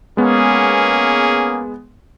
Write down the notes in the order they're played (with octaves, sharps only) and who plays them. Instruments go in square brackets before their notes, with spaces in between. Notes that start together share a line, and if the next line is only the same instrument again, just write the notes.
[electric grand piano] G#3 B3 [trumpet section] A#3 C#4 G#4